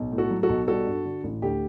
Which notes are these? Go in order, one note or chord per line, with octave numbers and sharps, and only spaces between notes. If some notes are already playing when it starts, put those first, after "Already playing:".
Already playing: B1
A2
F#4 A4
F#3
F#4 A4
B1
G3 F#4 A4
G2
D3
A1
D2 G4